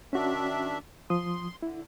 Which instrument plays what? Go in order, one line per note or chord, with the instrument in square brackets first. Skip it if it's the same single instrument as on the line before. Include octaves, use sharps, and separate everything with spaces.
[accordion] D#3 D4 E5 [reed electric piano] C#4 F#4
[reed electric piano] F3 D#6 [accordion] C6
[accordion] D3 [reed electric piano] E4